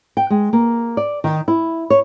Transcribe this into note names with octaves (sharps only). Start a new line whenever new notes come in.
G5
G#3
A#3
D5
D#3
E4
C#5